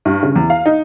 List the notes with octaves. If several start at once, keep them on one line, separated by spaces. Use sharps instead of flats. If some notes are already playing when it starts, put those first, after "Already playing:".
G2
C#3
E2
F5
D#4